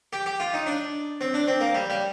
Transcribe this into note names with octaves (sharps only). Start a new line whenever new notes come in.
G4
G4
F4
D#4
D4
C4
D4
C4
A#3
G3
G3